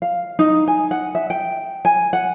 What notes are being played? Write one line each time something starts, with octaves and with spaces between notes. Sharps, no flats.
F5
D#4
G#5
F#5
E5
G5
G#5
F#5